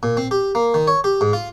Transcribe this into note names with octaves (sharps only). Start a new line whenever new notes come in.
A#2
C4
G4
A#3
D#3
C#5
G4
G#2
F4